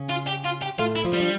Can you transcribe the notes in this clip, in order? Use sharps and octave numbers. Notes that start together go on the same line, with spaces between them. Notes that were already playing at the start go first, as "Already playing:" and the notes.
Already playing: C#3 C#4
F4
G4
F4
G4
A2 A3 F4
E4
F3 F4
G3
D4